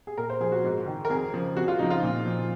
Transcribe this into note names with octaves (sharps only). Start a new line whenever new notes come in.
G#4
A#2 A#4
C5
F3 G#4
F#4
G#2
D#3
A#4
F2 G#4
C#3 F3
F2 F#4
F4
C#3 F3 D#4
F4
A#2
F3